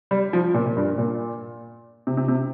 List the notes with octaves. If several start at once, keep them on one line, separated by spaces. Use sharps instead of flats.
G3
F3
A#2
A#2
G2
A#2
C3
C3
C3